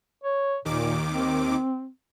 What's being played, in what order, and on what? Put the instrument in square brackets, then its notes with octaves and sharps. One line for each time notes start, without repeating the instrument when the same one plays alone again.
[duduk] C#5
[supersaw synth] D#2 D#3 D6 [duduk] A#2
[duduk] C4